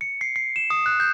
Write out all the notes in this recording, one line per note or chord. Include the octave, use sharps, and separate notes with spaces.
C#7
C7
C7
E7
D#6
F#6
G6